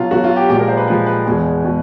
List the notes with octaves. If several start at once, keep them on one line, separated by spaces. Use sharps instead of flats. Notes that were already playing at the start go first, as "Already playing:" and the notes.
Already playing: B2 F#3 F4
B2 F#3 F#4
F4
G4
A#2 F3 G#3 G4
A#4
C5
B4
A#2 F3 G#3 B4
B4
E2 B2 G#3
B2 G#3